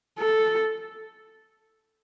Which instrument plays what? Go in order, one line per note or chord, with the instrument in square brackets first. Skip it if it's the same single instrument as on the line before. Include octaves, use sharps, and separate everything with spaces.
[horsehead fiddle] A4